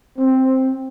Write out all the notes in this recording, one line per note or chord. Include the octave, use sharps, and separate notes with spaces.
C4